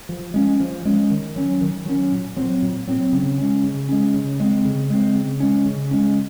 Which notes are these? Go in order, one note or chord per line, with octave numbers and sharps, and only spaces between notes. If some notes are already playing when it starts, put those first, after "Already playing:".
F3
G#3 C#4
F3
G#3 C#4
D#3
F#3 C#4
D#3
F#3 C#4
A#2
F#3 C4
A#2
F#3 C4
C#3
G#3 C#4
C#3
G#3 C#4
C#3
G#3 C4
C#3
G#3 C4
C#3
G#3 C#4
C#3
G#3 C#4